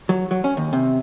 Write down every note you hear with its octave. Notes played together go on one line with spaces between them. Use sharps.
F#3
F#3
C#4
D#2
C3